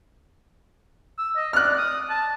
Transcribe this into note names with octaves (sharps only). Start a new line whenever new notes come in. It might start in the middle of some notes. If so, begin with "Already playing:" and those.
E6
D#5
D5 F6 F#6
D#6
A5